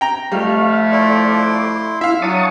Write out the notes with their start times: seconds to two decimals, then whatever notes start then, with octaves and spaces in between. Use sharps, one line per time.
0.01 G5 A#5
0.32 F2 G3 A3 F5
0.92 E4 D5 C6
2.01 E4 E5 F5
2.22 F#3 D4 A5 C#6 D#6